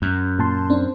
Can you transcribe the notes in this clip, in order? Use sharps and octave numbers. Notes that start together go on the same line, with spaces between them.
F#2
A#2 A5 C6
C4 D4